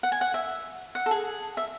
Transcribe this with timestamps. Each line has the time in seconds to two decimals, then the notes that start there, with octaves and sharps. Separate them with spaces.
0.03 F#5
0.12 G#5
0.21 F#5
0.34 E5
0.95 F#5
1.06 A4
1.11 G#4
1.57 E5